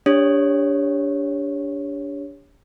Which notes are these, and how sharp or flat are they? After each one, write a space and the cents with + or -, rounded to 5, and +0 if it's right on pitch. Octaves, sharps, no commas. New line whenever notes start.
D4 -25 G4 +25 C#5 +0